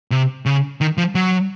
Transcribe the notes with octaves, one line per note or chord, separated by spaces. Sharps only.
C3
C#3
D#3
F3
F#3